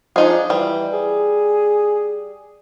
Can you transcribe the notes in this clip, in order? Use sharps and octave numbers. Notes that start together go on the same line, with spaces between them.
F3 D4 D#4 G#4
E3 G3
G#4